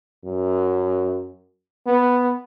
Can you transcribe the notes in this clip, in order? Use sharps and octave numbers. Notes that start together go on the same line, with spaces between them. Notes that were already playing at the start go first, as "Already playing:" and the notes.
F#2
B3